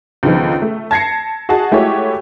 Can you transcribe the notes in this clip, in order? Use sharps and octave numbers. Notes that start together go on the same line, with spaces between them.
C#2 D3 D#3 F3 B3
A3
A5 G#6 A#6 C7 C#7
F#4 G#4 D#5 F#5 A5
G#3 A3 E4 F#4 G4 C#5